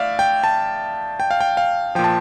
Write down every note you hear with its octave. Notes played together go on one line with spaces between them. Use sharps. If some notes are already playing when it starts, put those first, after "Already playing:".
Already playing: A2 D5 E5 F5
G5
A5
G5
F5
G5
F5
A#2 F3 G5
A5